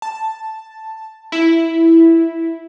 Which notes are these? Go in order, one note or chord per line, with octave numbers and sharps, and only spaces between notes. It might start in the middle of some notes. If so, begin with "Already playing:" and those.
A5
E4